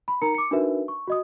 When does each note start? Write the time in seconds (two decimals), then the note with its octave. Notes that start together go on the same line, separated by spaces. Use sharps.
0.08 B5
0.22 D#4 A#4 A#5 C#7
0.35 D6 C#7
0.51 D4 D#4 F#4 A#4 B4 E5
0.88 C#6
1.08 F#4 D#5 D#6